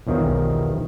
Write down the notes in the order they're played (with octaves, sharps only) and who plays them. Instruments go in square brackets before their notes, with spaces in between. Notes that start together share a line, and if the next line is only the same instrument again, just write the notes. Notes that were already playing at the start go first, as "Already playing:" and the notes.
[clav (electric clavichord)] B1 E2 D#3 F3 G3